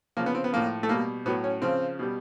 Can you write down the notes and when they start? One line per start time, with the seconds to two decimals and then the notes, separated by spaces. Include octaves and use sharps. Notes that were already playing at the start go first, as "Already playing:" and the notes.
0.17 C#3 F3 A#3
0.26 B3
0.35 C4
0.44 B3
0.52 A2 F3 A#3
0.83 A3
0.89 B2 G3 A#3
1.26 A2 F#3 B3
1.44 C#4
1.62 C#3 F3 C4
1.99 B2 G3